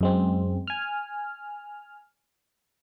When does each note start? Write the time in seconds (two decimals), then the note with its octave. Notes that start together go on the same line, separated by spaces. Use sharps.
0.01 F#2 G#3 C4
0.67 G#5 F6